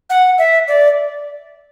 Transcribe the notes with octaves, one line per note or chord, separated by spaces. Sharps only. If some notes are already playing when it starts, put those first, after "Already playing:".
F#5
E5
D5